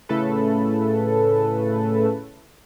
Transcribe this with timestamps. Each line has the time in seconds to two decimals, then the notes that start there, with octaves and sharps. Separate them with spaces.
0.09 A2 C#3 A3 A4 B4